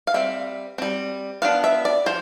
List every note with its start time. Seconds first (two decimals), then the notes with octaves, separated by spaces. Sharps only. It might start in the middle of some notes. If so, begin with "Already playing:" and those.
0.07 F5
0.14 G3 C4 E5
0.78 G3 C4
1.42 F3 B3 D4 F5
1.64 E5
1.85 D5
2.06 F3 C5